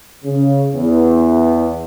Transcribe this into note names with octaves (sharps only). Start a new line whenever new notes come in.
C#3
E2